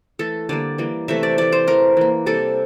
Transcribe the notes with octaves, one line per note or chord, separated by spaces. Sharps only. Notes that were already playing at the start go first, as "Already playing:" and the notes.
E3 A3 A4
D3 G3 A#3 D5
E3 G3 A#3
C3 E3 A3 E5
D5
E3 A3 D5
C5
E3 A3 A#4
E3 A#3
C3 G3 A#3 A4